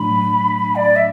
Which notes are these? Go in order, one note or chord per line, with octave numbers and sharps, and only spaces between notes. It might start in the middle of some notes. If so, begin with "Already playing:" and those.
Already playing: A2 F#3 A3 D4 B5
D5
E5